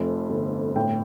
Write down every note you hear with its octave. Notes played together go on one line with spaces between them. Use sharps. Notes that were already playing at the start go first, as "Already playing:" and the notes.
Already playing: F1 F2
G1
A2 G5